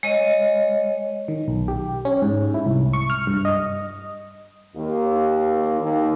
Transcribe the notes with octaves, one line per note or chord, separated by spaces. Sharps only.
G#3 C#5 D#5
D#3
B1
G4
C#4
G#2
E4
C2
C#6
F6
G2
D#5
D#2
D#2